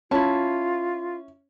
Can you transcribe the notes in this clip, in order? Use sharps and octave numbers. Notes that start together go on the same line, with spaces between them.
C#4 E4 F4 A5